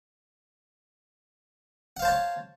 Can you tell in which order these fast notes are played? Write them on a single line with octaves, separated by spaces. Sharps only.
F#5 F5 C5 A5 C#5